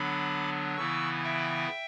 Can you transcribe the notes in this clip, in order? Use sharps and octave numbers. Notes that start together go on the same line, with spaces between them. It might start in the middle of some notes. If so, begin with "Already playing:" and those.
Already playing: D3 F#3 B3 D4 B5 D6
C#3 E3 B3 E4 C#6 E6
E5 G5